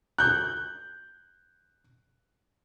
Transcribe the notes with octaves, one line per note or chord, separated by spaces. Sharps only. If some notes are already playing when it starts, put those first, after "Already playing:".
F#6 G6